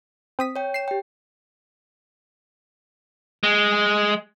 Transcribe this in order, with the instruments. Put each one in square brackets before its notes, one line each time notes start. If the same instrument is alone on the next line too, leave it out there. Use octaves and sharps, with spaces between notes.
[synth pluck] C4 D#6 B6
[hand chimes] C#5 G5
[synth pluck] C7 E7
[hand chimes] G4 G5
[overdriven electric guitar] G#3